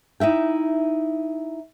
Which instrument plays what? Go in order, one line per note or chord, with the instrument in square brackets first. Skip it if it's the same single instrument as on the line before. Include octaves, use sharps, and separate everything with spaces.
[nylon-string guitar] D#4 E4 E5 G5